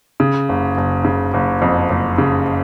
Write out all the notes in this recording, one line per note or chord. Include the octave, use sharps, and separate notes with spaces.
C#3
F#1
F#1
C#3
F#1
F2
F#1
C#3